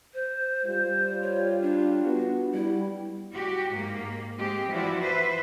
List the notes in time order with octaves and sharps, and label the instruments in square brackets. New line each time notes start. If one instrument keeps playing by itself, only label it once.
[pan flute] C5
[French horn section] G3 F4
[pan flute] C#5
D4
[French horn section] B3 F#4
[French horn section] G3 [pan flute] E4
[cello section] F#4 G4
G#2 A#3
G#3 C4 G4
E3 F3 E4 F#4 D5
B4 C5 E5